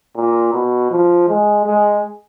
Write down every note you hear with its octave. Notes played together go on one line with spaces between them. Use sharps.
A#2
B2
F3
G#3
G#3